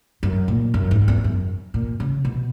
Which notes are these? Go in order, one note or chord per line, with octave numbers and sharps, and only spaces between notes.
F#2
A#2
F#2
G#2
E2
F#2
A#2
C#3
B2